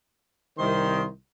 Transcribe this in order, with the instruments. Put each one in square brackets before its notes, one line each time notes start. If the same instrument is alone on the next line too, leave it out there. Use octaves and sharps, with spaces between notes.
[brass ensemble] C2 D#3 [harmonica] C5 C6